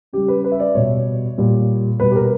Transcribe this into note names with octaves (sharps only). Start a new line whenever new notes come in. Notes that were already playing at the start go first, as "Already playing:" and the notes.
C#3 G3 G4
B4
B4
E5
D5
B2 G3 C#5
A#2 G3
B2 G3 B4
G4
A#4